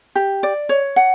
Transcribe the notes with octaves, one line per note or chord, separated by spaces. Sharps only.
G4
D5
C#5
F#5